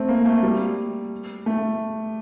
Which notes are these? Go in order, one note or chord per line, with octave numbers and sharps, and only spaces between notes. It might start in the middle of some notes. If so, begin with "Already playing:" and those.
Already playing: A3 C4
A#3
A3
G3
A3